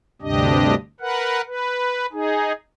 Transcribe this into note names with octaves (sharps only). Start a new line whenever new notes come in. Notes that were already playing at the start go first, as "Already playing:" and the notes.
D2 G2 C3 D4 G4 D#5
A#4 B4 F#5
B4
D#4 G#4